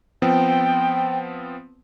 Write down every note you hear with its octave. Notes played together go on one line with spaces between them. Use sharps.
F3 B3 C4 G5